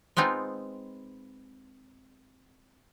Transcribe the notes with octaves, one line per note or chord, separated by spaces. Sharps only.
G#3 B3 C4 D#4 F4